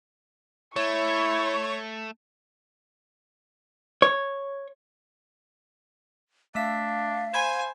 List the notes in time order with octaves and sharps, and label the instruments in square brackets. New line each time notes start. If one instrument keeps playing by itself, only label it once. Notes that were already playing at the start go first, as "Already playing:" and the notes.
[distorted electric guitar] A3 [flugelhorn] E4 [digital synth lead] C#5 [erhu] C#6
[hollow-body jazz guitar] C#5
[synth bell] A3 E5 B6 [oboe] D4 [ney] F5
[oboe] C5 [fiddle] G#5 [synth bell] B5 G#6 E7